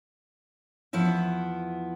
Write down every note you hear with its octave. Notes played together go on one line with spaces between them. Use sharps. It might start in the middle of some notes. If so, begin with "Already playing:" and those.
E2 F3 B3 E4 E5